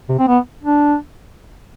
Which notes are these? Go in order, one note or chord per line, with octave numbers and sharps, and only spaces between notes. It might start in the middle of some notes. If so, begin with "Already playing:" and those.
C3
C4
B3
D4